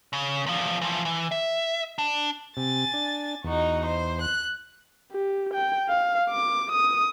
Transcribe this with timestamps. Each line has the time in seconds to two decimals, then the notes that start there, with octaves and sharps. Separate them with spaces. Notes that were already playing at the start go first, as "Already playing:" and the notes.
0.13 C#3
0.46 E2 F3
0.82 E3 F3
1.05 E3
1.31 E5
1.98 D4
2.57 C3 G#5 A6
2.94 D4
3.44 E2 D#4 F#4
3.85 C5
4.21 F#6
5.12 G4
5.54 G5
5.89 F5
6.30 D6
6.72 D#6